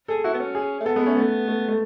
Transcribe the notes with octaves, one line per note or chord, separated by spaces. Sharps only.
G#4 A4
E4 F#4
B3
C#4
G#4
A3
B3 A4
G#3 B3
A3 C#4
A3 B3
A3
A3